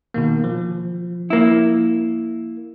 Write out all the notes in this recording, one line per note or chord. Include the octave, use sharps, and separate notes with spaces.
B2 D#3 A#3
F3
A#3 E4